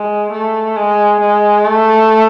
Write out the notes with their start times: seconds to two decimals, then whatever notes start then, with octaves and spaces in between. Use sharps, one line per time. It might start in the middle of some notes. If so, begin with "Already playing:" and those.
Already playing: G#3
0.33 A3
0.76 G#3
1.21 G#3
1.65 A3